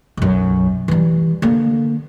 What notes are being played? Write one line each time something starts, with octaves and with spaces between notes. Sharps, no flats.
B1 F#2
E3 G3
D3 A#3